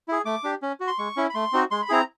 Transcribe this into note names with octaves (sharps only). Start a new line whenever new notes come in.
E4 G#4
A3 D6
D4 G4
C#4
F#4
C6
G#3 C#6
C#4 E4
B5
A3 C6
C4 D#4 F#4
G#3 C6
B5
C4 E4 G#4 A#5